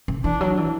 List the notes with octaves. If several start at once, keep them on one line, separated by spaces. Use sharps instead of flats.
C#3
E3 D4
F#3
E3